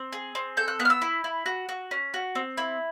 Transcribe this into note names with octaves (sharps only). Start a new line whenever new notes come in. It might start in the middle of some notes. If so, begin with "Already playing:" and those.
Already playing: C4
G#4
C4
A4 G6
F#6
B3 F#6
F6
E6
E4
E4
F#4
F#4
C#4
F#4
C4
E4